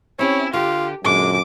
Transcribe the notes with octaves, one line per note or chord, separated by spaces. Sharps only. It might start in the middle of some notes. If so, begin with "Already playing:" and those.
C4 C#4 E4 G4 C#5
D3 F4 G4
F#2 A#2 D3 G#3 D6